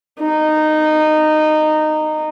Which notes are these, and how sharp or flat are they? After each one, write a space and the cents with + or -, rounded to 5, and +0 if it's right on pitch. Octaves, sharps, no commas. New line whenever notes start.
D#4 -15